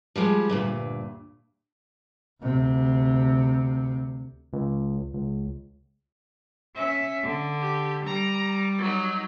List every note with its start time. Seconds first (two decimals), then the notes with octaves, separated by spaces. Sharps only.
0.16 F3 G3 G#3
0.49 D2 G2 A#2
2.42 D2 C3
4.53 C#2
5.14 C#2
6.75 C#4 E5
7.23 D3
7.61 G4
8.06 G3 A#5
8.79 F#3 D#4